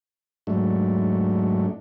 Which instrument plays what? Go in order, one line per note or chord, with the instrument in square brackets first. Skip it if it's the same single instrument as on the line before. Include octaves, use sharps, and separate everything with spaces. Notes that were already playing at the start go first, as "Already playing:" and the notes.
[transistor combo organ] G#2 F#3 A3 D4